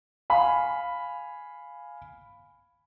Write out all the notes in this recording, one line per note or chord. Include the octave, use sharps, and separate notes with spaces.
F5 G#5 B5